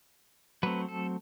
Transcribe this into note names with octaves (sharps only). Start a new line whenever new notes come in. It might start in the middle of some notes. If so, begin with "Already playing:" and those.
F#3 A3 C4 B4
A4